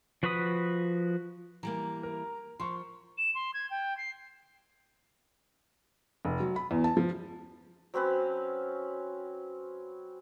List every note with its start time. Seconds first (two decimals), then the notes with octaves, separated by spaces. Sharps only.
0.23 F3 F#4 B4 B5 D#6
1.63 E3 G3 A#3 A#5
2.03 A#4
2.60 F3 C6 C#6
3.18 E7
3.35 C6
3.54 G#6
3.70 G5
3.98 C7
6.25 F1
6.40 F#3
6.56 B5
6.71 E2
6.84 A5
6.97 F3
7.94 F#3 C4 C#4 B4